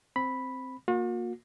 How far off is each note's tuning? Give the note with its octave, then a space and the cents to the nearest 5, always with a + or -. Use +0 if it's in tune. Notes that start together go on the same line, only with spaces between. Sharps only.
C4 +0 B5 +0
A#3 +0 F#4 -45